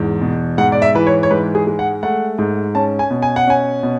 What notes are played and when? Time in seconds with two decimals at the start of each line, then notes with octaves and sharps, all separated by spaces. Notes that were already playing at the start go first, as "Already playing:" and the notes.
Already playing: E2 G#2
0.21 B2
0.58 G#2 F#5
0.72 D5
0.82 E5
0.95 E3 B4
1.07 C#5
1.23 C#5
1.31 G#2 B4
1.55 G#4
1.67 G#3
1.79 F#5
2.03 A3 F#5
2.38 G#2
2.75 C#4 A5
2.99 G#5
3.11 B2
3.22 G#5
3.36 F#5
3.47 C#4 G#5
3.83 B2